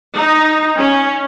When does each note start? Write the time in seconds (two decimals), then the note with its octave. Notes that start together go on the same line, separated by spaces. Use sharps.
0.17 D#4
0.78 C#4